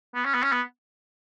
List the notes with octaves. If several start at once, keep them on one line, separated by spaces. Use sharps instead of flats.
B3
C#4
B3
C#4
B3